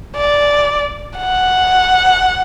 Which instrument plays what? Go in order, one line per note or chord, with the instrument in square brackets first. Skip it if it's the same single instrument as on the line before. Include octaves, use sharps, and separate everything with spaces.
[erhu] D5
F#5